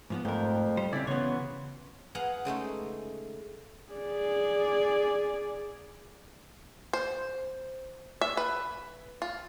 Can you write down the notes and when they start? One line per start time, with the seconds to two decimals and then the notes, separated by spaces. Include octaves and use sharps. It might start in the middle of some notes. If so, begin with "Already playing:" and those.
0.10 G#2 F3 B3
0.25 F2 G#2 A3 A#4 C5 G5
0.77 G3 C5
0.93 C#3 C4 E4 G4 D5
1.07 C#3 E3 B3 F#4 C#5 C6
2.15 G#4 B4 F5 F#5 A#5
2.45 C#3 G#3 A3 D#4
3.92 G#4 D5
6.93 C5
8.21 E5
8.37 B4
9.22 F4